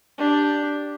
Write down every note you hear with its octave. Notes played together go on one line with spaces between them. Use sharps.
D4 G4